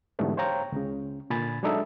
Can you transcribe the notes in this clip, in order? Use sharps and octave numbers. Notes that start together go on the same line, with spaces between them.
G#2 D3 E3 G3 A3 B3
C5 C#5 F5 G5 A#5
C#2 C#3
A#2 D3 G#5 B5 A6
F#3 G#3 D4 D#4 A4 E5